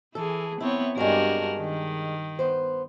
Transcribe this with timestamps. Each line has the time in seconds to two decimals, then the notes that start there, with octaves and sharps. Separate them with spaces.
0.15 E3 G#4 A4
0.60 B3 C4 E4 C#5
0.97 G2 G#3 D4 F#4 A#4
1.59 D#3
2.39 B3 C5